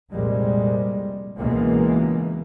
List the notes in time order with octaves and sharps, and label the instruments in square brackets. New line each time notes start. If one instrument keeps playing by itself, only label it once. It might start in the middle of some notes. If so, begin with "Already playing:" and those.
[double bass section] C2 F2 A#2 G3 G#3
C#2 B2 E3 G#3 A#3